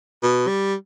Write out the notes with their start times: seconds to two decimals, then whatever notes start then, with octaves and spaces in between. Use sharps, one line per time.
0.23 B2
0.48 G3